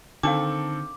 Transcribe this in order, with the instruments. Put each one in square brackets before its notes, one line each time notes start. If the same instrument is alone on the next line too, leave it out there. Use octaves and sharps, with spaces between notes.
[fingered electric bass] D3 [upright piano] D#3 C4 A4 [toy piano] D4 F5 [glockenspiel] D6